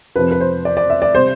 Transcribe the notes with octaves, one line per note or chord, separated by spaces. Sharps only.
F2 C3 F3 B4
B4
C5
D5
D5
E5
D5
C3 G3 C5